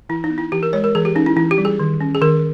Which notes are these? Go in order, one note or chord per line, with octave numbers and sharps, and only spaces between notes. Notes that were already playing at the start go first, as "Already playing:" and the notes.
E3 E4
D#4
B3
E4
E3 G4
A#4
G#3 C#5
A#4
E3 G#4
G4
C#4 D#4
E4
E3 E4
G4
G3
G#4
D#3
C#4
G#4
D#3 A#4